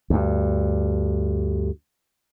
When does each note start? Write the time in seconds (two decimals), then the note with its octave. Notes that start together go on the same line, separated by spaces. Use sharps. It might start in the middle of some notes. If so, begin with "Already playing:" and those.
0.10 D2 G2